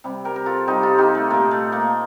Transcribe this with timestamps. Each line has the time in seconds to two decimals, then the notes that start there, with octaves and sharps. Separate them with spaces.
0.04 C3 G3
0.25 G4 A#4
0.36 A#4
0.46 F4 A4
0.67 C3 G3 D#4 G4
0.83 F4 A4
0.98 D#4 G4
1.15 A3
1.30 A#2 A3 A#3
1.51 A3
1.72 A#3